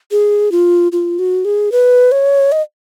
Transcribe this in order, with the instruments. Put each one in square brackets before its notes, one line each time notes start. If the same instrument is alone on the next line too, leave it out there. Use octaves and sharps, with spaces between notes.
[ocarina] G#4
F4
F4
F#4
G#4
B4
C#5
D#5